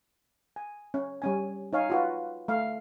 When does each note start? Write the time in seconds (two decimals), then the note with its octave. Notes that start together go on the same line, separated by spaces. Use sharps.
0.56 G#5
0.94 C#4
1.22 G3 C#4 G#5
1.73 D#4 C#5 F5 G#5
1.90 F4 F#4 B4
2.48 A3 F5